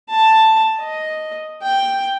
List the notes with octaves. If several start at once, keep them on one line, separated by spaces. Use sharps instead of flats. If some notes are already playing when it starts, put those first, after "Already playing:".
A5
D#5
G5